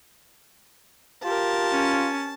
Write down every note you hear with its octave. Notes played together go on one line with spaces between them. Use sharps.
F4 G4 A#4 A5
C#4